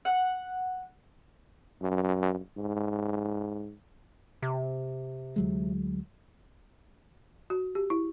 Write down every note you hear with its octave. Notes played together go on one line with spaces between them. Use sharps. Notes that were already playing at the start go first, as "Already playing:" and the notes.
F#5
F#2
G#2
C3
D2 F#3 G#3
F#4
G4
E4